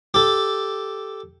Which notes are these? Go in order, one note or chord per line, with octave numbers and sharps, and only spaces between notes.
G4 A4